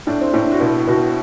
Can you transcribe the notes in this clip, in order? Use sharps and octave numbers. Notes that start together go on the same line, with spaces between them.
A2 D4
C4
A2 D4
F#4
B2 E4
B2 F#4